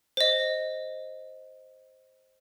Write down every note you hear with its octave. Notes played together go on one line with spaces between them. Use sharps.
C5 D#5